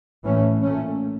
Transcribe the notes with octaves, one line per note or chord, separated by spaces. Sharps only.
A2 E3 A3 C#4
A#2 A3 C#4